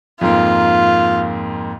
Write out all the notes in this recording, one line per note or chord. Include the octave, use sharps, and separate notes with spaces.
F2 G#2 A#3 F4